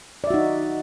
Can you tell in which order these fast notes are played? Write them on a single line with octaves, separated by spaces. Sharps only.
D5 E5 F#4 D#4